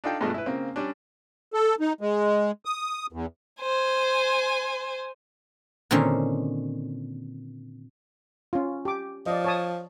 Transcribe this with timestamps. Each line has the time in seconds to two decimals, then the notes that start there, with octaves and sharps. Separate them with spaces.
0.04 D4 D#4 F4 A4 G5
0.21 G2 B2 G#3 A3 D4 A5
0.34 E4 B4
0.46 C#3 A#3 C4
0.76 G3 C#4 D4
1.53 A4
1.80 D#4
2.01 G#3
2.65 D#6
3.12 E2
3.61 C5 G#5
5.91 A#2 D3 D#3 C4 C#4
8.53 C#4 F4
8.85 G4 D6
9.26 F3 D5 D#5
9.44 C#5 A5 D#6